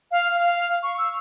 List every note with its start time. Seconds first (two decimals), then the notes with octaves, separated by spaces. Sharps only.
0.11 F5
0.35 F5
0.83 C#6
0.98 E6